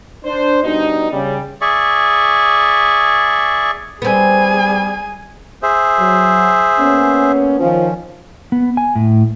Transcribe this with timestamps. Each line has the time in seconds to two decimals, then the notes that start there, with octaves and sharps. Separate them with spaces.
0.24 D4 C5
0.63 B2 G3 D4 D#4
1.11 C#3 G3
1.61 G#4 D5 E5 C#6
4.02 G3 B3 C4 G#4 G#5
5.63 G#4 C5 E5
5.99 F#3
6.79 A#3 B3 C#4
7.60 D#3 F3 C#4
8.52 B3
8.77 G#5
8.96 A2